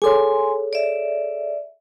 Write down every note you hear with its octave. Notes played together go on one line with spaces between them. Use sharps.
G#4 A4 C#5 G#5 C6
D5 E5